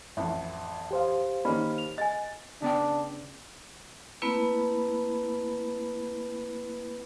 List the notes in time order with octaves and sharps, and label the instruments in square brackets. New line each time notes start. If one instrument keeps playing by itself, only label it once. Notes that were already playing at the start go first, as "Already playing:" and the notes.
[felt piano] A1 F2 [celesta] E5
[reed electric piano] G4 C5 F5
[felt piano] D#3 A#3 C#4 [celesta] D#5 B5
[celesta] F7
[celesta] D#5 G#5 [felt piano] A6
[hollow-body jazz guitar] C#3 B3 G5 [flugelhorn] D4
[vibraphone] A3 A#3 C4 E4 B4 B5